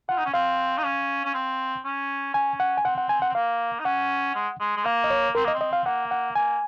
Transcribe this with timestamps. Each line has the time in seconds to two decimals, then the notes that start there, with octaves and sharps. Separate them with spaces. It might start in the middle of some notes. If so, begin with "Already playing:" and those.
0.09 F4 F#5
0.18 D#4
0.26 C#4
0.34 C4 F5
0.78 D#4
0.84 C#4
1.25 C#4
1.34 C4
1.85 C#4
2.34 C#4 G#5
2.60 F#5
2.77 G#5
2.85 C4 F#5
2.98 F#5
3.09 G#5
3.22 F#5
3.29 C4
3.35 A#3 F5
3.80 D#4
3.85 C#4 F#5
4.35 G#3
4.60 G#3
4.76 G#3
4.85 A#3 F5
5.04 D#5
5.10 C#5
5.35 C4 A#4
5.44 A#3 D#5
5.54 C4
5.61 D#5
5.73 F5
5.85 A#3 F#5
6.11 F#5
6.35 A#3 G#5